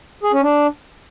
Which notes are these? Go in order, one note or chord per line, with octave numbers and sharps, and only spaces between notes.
G#4
C#4
D4